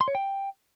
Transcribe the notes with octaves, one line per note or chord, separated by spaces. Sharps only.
C6
C#5
G5